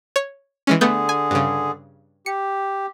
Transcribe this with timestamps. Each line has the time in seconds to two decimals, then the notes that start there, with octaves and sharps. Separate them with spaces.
0.16 C#5 G#6
0.67 E3 G#3 C#4
0.81 D3 A3 B3 G#4 G6
1.09 G#5
1.31 G2 C#3
2.26 G4 C#7